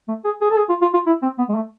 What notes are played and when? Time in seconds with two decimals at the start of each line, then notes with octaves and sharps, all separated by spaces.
0.08 A3
0.25 G#4
0.41 G#4
0.50 A4
0.57 G#4
0.69 F4
0.82 F4
0.94 F4
1.07 E4
1.23 C4
1.39 B3
1.49 G#3
1.55 A3